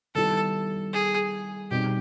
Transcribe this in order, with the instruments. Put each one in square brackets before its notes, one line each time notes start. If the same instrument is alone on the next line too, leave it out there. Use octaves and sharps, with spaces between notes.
[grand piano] D#3 G3 B3 E4 [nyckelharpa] A4
[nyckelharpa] G#4
[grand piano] B2 G3 C4 D#4 [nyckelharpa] G4